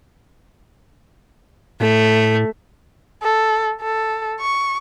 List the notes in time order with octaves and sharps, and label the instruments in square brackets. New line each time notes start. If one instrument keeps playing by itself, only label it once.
[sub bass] A2 [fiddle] A3
[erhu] A4
A4
C#6